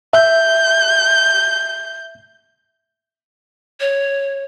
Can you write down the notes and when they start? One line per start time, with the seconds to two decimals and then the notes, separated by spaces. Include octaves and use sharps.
0.13 E5 G6
3.80 C#5